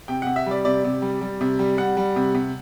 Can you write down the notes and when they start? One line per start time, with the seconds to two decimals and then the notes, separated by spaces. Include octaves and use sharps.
0.08 C3 G5
0.22 C3 F#5
0.36 E5
0.46 G3 D5
0.65 C3 D5
0.84 C3
1.02 G3
1.21 G3
1.41 C3
1.59 G3
1.78 G3 F#5
1.97 G3
2.16 C3
2.34 C3